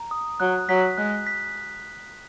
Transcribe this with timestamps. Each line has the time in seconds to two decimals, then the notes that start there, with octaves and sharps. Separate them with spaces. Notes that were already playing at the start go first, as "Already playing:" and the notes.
Already playing: A#5
0.11 D#6
0.40 F#3 F#6
0.69 F#3 B6
0.98 G#3 F#6
1.27 B6